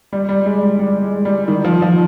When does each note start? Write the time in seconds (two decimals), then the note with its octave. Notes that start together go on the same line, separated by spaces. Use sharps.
0.13 G3
0.29 G3
0.46 G#3
0.63 G3
0.79 G3
1.02 G#3
1.25 G3
1.48 D#3
1.65 F3
1.82 F3